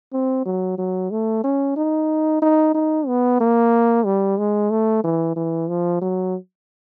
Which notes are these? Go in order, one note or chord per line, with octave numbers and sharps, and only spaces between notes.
C4
F#3
F#3
A3
C#4
D#4
D#4
D#4
B3
A#3
G3
G#3
A3
E3
E3
F3
F#3